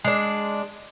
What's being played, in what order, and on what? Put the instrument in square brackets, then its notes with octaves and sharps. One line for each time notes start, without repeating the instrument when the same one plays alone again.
[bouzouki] G#3 D4